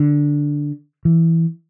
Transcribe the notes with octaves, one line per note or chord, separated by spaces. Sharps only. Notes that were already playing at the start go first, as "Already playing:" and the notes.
Already playing: D3
E3